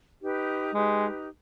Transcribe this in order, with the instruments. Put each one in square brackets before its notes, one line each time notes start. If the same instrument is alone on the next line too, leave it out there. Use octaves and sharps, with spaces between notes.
[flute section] D#4 G4 B4
[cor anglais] G#3 [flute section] D#4 G4 B4